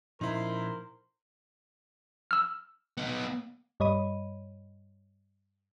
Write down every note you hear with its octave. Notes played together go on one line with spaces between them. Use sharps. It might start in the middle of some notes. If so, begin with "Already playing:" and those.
A#2 F3 C#4 D#4 E4 A#4 C5 C6
E6 F6
B3 D#4
G2 G3 C#5 D#5 B5 D#7